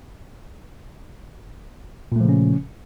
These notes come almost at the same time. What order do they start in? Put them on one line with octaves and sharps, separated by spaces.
A#2 A3 F3 C#3 C#4